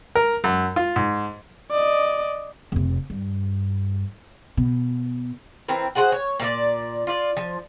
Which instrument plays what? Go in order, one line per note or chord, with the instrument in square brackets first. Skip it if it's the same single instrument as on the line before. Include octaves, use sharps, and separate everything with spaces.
[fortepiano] A#4
F#2
F4
G#2
[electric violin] D5 D#5
[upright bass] F1 C3
G2
B2
[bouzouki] E3 C4 A#4
F#4 G#4 C5 F#5
C#5
A#2 F4 D5
F4 D5
F3